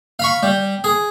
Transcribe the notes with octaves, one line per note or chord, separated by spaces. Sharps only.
F5 B5 C#6
G3
G#4